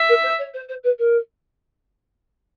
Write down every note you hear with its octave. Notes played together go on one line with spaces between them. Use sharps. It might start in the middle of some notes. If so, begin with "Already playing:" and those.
Already playing: E5
A#4
C5
C#5
C5
C5
B4
A#4